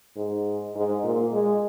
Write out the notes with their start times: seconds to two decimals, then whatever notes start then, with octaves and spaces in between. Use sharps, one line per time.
0.16 G#2
0.75 G#2
1.04 A#2
1.33 G#3